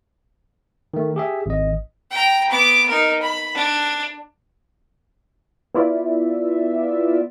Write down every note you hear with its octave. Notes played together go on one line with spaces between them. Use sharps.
D#3 A3
G4 G#4 E5
G#1 D#5
G5 A#5
B3 D6
D#4 A#4
B5
D4
B3 E4 F4 D5 E5